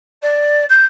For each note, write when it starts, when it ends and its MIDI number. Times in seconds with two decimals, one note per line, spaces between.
0.22 0.65 74
0.69 0.84 91